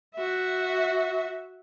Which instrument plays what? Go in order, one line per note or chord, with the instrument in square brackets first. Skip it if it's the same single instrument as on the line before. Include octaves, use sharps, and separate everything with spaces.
[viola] F#4 E5